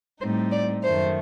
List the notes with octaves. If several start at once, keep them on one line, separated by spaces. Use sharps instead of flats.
A2 G3 C4 D#4 C5
D5
F#2 D#3 A3 C5